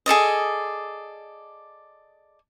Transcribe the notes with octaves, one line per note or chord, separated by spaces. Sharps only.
G#4 A4 D5 D#5